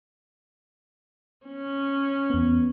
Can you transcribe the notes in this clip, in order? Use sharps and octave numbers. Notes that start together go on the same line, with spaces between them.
C#4
E2 B3